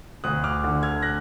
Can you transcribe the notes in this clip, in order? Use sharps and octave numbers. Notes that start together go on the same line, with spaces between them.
D2 D#6 F#6
D6 F6
D3
F6 G#6
F#6 A#6